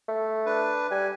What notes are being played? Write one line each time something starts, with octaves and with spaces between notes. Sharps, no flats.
A3
D4 B4
G3 G#5